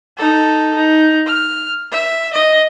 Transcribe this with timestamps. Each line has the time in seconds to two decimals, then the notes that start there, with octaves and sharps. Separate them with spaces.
0.17 D#4 A4
0.76 D#4
1.26 F6
1.92 E5
2.33 D#5